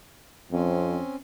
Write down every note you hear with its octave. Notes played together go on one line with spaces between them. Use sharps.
F2 C4 C#4